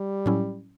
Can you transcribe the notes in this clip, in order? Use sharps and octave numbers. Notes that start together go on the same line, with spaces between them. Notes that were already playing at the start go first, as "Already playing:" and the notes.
Already playing: G3
A2 F#3 C#4 E4